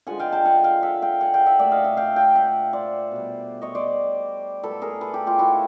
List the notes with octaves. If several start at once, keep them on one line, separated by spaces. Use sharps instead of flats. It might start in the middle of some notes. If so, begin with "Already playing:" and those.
D3 F3 G#3 F#5 G#5
F5 G5
G5 A5
F#5 G#5
F5 G5
E5 F#5
F5 G5
F#5 G#5
F5 G5
E5 F#5
A#2 F#3 A3 D5 E5
D#5 F5
E5 F#5
F5 G5
F5 G5
E5 F#5
C5 D5
B2 G3
C#5 D#5
C5 D5
A2 F#3 A3 A4 B4
G#4 A#4
A4 B4
G4 A4
F4 G4
E4 F#4